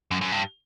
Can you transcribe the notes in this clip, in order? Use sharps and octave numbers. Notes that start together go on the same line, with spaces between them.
F#2
F#2
G2